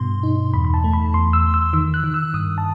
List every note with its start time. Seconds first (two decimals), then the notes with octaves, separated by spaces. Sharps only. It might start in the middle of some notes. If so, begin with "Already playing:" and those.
Already playing: G2 B2 C6
0.23 D#4
0.53 E2 B5
0.65 B5
0.74 A5
0.84 A3
0.93 B5
1.14 E2 C6
1.33 E6
1.44 E2
1.54 E6
1.73 D#3 E6
1.94 F#6
2.04 D#3
2.14 E6
2.34 G2 D#6
2.58 A5